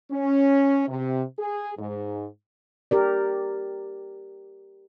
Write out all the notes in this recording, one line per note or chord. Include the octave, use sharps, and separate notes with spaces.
C#4
C3
G#4
G#2
G4 A#4 D5